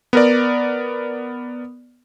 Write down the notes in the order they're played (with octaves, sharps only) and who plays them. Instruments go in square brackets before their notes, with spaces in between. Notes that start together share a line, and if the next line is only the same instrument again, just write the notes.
[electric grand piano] B3 A#4 D5